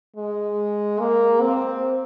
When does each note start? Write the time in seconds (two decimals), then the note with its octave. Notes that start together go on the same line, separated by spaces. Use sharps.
0.16 G#3
0.99 A#3
1.41 C4